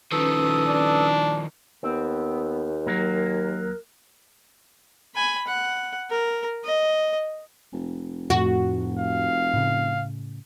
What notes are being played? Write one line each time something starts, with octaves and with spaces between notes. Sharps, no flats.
D#3 F3 C#4 A4 B4 D#6
D4
D#2 B3 C4
F#3 A#3 A#4
G#5 B5
F#5
A#4
D#5
F1
F2 A2 F#4
F5
A2 C#3